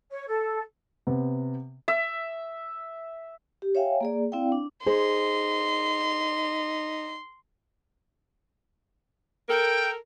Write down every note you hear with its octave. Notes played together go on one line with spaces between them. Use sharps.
C#5
A4
C3 B3
E5
G4
C#5 E5 F5 G5 G#5
A#3 G#4 D5
C4 E4 D5 F5 G5
D4
D#4 G#4 C5 C6
A4 A#4 G5